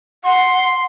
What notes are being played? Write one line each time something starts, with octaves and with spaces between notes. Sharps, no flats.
F#5 C6